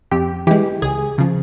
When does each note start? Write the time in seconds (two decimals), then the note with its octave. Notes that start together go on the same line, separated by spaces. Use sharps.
0.11 F2 G4
0.47 E3 G#3 G4
0.82 C#2 G#4
1.18 C#3 F3